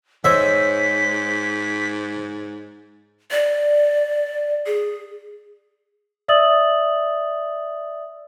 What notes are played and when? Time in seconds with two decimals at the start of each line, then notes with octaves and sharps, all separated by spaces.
0.24 G#2 C5 C#5 D#5 E5 B6
3.31 D5
4.66 G#4
6.28 D5 E5 D#6 E6 A6 F#7